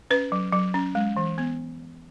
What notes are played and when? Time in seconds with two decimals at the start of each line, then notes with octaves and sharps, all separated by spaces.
0.11 C#4 B4
0.32 F#3
0.53 F#3
0.74 C#4
0.95 G#3
1.17 E3
1.38 B3